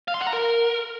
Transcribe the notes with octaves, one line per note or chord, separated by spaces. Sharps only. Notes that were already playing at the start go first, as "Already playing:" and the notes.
F5
C6
F#5
A#5
A#4